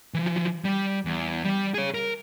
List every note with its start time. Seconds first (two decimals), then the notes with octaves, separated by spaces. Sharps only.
0.14 E3 F3
0.65 G3
1.05 E2
1.44 G3
1.74 G#4 C#5
1.94 A#4